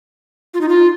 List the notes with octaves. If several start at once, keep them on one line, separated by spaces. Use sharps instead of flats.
F4
D#4
F4